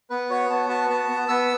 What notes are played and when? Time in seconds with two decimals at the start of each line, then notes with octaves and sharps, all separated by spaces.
0.10 B3 B4
0.30 F#4 C#5
0.50 B3 A5
0.69 F#4 A5
0.89 B3 A5
1.09 B3
1.29 B3 E6